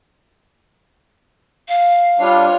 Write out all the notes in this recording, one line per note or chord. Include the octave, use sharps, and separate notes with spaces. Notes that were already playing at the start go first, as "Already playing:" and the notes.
F5
G3 D4 F4 C#5